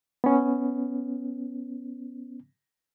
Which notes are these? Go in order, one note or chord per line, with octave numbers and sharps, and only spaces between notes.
B3 C#4